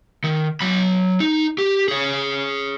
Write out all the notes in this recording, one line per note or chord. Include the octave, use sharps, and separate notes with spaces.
D#3
F#3 B5
D#4
G4
G#4 C#5